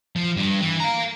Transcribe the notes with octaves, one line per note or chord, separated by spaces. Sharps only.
F3
G2
E3
F5 A#5